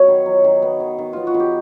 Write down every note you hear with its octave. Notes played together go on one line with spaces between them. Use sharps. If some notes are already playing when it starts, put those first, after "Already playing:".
Already playing: F#3 B3 C#5 D#5
D#3
F#3
D#3
B3
D#3
D#3
B3 F4
F#4
D#3
G4